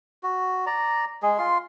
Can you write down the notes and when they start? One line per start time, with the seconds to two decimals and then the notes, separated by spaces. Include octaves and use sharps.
0.23 F#4
0.66 D5 A#5
1.23 G#3 G#4
1.38 F4 C6